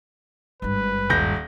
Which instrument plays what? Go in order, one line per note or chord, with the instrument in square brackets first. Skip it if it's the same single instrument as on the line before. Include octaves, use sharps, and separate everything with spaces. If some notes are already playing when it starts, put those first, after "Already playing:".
[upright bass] G#1 G2 [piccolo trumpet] B4
[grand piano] D#1 G6 A#6